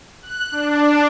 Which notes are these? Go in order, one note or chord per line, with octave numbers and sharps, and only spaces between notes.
F#6
D4